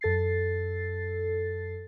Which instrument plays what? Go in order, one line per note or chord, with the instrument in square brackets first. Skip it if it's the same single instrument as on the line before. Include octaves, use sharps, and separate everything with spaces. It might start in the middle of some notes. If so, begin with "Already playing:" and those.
[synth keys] F#2 A4 A6 C7